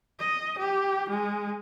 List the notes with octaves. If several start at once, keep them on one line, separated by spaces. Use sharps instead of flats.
D#5
G4
G#3